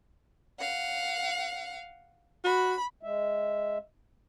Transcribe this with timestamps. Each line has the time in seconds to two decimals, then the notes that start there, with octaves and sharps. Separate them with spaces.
0.60 F5 F#5
2.44 F#4 B5
3.03 G#3 E5